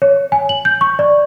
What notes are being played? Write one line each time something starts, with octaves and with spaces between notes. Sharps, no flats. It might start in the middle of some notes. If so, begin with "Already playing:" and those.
C#5
G#5
F#7
G6
C#6
D5